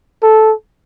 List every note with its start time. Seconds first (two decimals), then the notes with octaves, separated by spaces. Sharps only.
0.23 A4